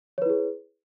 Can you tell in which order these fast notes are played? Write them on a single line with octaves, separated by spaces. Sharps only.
C#5 B4 E4 G#4